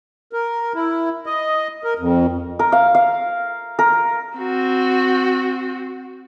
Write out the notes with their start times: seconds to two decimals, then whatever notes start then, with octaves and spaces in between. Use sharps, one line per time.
0.33 A#4
0.75 E4
1.26 D#5
1.84 A#4
1.99 F2
2.59 A#4
2.72 F5
2.95 F5
3.79 A#4
4.37 C4 F#4